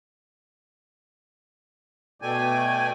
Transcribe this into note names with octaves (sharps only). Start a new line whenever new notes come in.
B2 A3 D5 G5 G#5